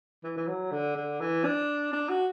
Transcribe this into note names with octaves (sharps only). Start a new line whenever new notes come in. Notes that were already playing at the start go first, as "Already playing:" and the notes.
E3
E3
F#3
D3
D3
E3
D4
D4
F#4